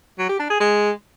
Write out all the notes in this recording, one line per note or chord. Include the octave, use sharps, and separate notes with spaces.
F#3
G4
D4
G#4
G#3